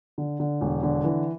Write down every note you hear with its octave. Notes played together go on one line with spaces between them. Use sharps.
D3
D3
E1
D3
E3